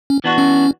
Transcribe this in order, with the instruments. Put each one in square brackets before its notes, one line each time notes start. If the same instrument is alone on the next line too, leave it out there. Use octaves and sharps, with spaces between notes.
[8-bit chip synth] C#4
[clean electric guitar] E3 B3 D4 F#4
[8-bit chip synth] C#4